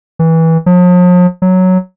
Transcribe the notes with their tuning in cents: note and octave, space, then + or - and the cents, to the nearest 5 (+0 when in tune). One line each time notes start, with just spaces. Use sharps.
E3 -20
F3 +45
F#3 +0